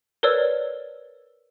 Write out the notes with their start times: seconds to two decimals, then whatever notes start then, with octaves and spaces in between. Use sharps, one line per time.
0.23 A#4 B4 C#5 D5 E6